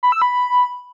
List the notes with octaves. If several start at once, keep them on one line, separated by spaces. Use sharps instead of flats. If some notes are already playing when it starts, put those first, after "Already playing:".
B5
E6
B5